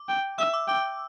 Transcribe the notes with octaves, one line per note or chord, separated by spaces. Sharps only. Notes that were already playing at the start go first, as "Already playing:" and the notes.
Already playing: D6
G5
E5 E6
D6
G5 D6